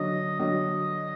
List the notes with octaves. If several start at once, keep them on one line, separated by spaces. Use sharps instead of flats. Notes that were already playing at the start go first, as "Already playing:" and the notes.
Already playing: D3 F#3 D#5
D3 F#3 D#5